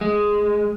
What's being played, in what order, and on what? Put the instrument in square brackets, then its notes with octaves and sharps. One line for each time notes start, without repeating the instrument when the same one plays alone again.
[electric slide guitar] G#3